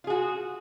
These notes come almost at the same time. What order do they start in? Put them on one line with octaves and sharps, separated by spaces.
F4 G#4 F#4